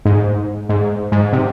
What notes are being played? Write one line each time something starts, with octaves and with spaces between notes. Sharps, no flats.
G#2
G#2
G#2
C3